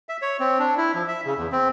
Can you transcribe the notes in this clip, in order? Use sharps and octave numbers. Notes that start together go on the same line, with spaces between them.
E5
C#5
C4
D4
E4
F3
E5
C#3
E2
C4